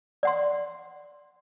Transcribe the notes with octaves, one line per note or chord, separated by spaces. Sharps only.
D5 F#5 C6